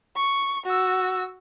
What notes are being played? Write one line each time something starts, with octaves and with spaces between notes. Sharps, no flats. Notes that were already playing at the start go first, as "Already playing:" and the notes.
C#6
F#4 E6